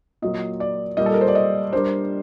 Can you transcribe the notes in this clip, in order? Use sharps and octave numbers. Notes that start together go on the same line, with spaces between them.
A#2 F#3 A#3 D#5
D5
A#2 G3 A#3 D#5
A4
A#4
C5
D5
D#5
G3 D4 G4 A#4 C5